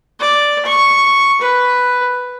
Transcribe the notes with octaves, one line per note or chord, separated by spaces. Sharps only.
D5
C#6
B4